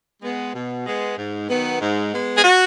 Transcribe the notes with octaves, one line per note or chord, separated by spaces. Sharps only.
G#3 B3
B2
G#3 B3
G#2
D#3 F#3 B3
G#2
G#3 B3
G#4
F#4